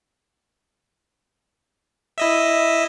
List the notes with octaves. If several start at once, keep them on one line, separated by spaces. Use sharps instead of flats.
E4 D#5 E5